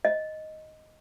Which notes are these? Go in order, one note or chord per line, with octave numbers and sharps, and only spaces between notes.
D#5